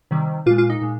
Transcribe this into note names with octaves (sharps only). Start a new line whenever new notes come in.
C3 D#3 G3
A#2 G#3 F4
F4
D#4
A#2 G#3